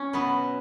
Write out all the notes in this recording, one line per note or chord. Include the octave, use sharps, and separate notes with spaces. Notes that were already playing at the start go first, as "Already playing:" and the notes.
Already playing: C#4
B2 F#3 B3 B4